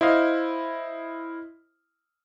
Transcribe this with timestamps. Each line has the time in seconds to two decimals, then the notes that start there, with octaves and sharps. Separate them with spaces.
0.01 E4 C5 D#5 F5